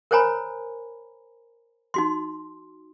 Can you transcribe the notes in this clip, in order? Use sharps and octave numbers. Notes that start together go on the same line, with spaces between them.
A#4 C5 C#5 G#5 A#5 B5
D#4 F#4 C6